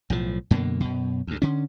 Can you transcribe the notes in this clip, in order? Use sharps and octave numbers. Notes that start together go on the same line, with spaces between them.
B1 A2 F3
F#2 B2 D3 A#3
F#2 B2
D2 G2
D3 C#4